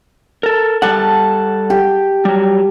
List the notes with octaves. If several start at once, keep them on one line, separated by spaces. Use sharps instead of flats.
A4 A#4
G3 A4 F#5 A5
G4
F#3 G3